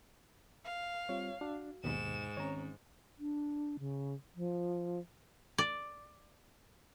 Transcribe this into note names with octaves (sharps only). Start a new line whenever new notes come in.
F5
G3 C4 F4 C#5
D4 F#4
D#2 G#2 B2 E7
D#3 C4 C#4 C#5 A#5
D4
C#3
F3
D5